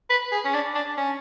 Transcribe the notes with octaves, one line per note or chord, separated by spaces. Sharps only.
B4
G#4
C#4
D4
D4
C#4